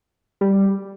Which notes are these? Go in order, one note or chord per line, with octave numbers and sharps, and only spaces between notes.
G3